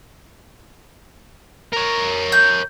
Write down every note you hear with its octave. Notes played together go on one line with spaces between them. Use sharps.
A#4 C#5
G6